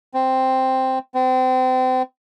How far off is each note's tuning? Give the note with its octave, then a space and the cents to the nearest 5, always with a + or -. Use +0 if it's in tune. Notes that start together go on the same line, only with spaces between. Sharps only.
C4 +0
C4 -30